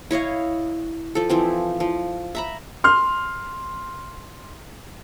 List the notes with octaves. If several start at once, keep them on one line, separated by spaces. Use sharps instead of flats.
E4 C#5 D#5 F5
F3 A4
E3 F3 C4
F3
E5 A#5 B5
C6 F6